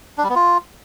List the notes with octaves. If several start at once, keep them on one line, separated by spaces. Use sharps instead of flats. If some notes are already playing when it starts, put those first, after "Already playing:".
D4
G3
B3
F4